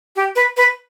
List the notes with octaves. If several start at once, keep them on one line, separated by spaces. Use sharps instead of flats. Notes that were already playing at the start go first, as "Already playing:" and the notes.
G4
B4
B4